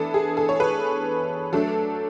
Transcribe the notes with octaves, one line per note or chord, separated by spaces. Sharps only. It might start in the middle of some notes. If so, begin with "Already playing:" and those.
Already playing: E3 B3 D4 A4
G#4
A4
C#5
B4
F#3 A3 D4 A4